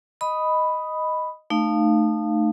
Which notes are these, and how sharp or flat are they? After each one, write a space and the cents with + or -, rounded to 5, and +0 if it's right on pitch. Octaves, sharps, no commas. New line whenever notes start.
D#5 +0 B5 +0 D#6 +0
A3 +0 D#4 -30 F5 +0